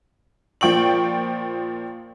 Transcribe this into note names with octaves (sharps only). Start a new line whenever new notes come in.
A#2 F3 G5 C#6 F#7